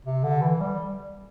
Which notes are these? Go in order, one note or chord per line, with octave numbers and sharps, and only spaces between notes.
C3
D3
E3
G3